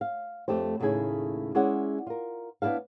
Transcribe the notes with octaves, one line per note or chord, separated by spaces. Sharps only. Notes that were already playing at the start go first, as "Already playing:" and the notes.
F5
F2 A3 D4 G4 C5
D#2 A2 C#3 E4 G#4 G#5
G#3 C#4 E4 G#4 D5 F#5
F4 A#4
B3 D4 E4 A4 F5